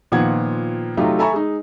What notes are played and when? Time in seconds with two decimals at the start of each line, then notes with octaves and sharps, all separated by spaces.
0.12 A#2 D#3 F3 B3 F#5 G#6
0.97 C3 F#3 A3 D#4 F4 G4
1.19 A4 E5 G#5 A#5 B5 C#6
1.33 G#3 D#4